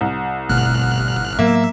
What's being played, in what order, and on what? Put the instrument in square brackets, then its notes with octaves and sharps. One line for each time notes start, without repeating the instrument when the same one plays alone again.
[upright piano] C2
[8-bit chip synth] G1 F6 F#6 [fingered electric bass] B2 A3
[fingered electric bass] A2 F#3 B3 [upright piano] A#3 [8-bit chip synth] E5